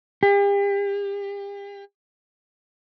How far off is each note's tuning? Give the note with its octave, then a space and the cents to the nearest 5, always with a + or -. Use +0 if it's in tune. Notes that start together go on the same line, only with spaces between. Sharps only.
G4 +40